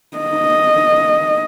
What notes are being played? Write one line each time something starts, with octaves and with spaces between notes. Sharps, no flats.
D#5